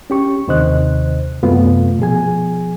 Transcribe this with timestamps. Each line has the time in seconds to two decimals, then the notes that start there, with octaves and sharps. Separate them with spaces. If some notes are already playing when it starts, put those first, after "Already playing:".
0.10 C#4 G4 C#6
0.48 D#2 C3 D#3 C5 D#5 F#6
1.43 F#2 C3 A3 B3 F4
1.99 B2 F3 G#4 G#5